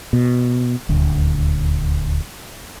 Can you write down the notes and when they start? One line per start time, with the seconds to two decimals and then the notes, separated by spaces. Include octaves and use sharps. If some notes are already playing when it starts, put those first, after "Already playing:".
0.13 B2
0.89 D#1 D2